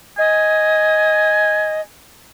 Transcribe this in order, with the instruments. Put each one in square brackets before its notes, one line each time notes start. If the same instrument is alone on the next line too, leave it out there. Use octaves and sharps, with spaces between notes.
[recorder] D#5 [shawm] G#5